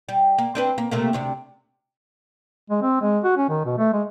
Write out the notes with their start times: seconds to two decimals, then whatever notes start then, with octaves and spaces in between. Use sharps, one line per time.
0.09 G3
0.38 A#3
0.55 C4 D4 B4
0.78 A#3
0.91 C3 A3 A#3
1.13 D2 C3 D4
2.70 G#3
2.82 C4
3.01 G#3
3.24 F#4
3.37 C#4
3.49 D#3
3.65 B2
3.78 A3
3.93 G#3